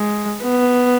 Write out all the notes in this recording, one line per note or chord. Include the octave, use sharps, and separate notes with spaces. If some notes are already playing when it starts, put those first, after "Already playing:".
Already playing: G#3
B3